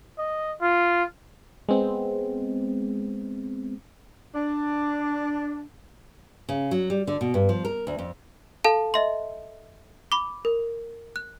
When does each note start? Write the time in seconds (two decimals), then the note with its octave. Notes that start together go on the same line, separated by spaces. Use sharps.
0.18 D#5
0.61 F4
1.69 G#3 B3 C4
4.35 D4
6.49 C#3
6.71 F#3
6.90 G3
7.07 D3
7.21 B2
7.34 G2
7.49 F3
7.65 A#4
7.87 D2
7.98 F2
8.65 A4 F5 A5
8.94 D#5 E5 C6
10.12 B5 D6
10.45 A#4
11.16 F#6